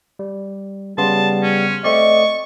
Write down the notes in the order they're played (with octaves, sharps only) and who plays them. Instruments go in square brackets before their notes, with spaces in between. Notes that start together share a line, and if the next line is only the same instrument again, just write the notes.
[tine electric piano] G3
[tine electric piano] C#3 B3 C6 [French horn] G3 [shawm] A5
[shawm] C#4
[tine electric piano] A3 C4 D5 [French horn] D#5 [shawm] C#6